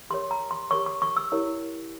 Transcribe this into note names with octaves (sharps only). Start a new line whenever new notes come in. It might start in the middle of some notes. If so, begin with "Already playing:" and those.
G4 A#4 C#5 C6
A#5
C6
G4 A#4 C#5 C#6
C#6
C#6
E6
E4 G4 A#4 C#5